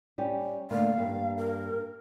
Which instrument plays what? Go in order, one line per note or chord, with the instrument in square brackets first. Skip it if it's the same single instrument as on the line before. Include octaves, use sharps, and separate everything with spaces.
[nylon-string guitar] G3 C#4 G4
[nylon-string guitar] D3 A3 A#3 [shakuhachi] F5
[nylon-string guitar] G2 A#3
[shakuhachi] A#4